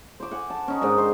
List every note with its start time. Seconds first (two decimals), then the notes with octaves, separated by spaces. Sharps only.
0.20 C5 D6
0.31 F#5 G#5
0.50 A5
0.68 C#4 D#4
0.81 G#2 D#3 D4 D#5
0.98 C5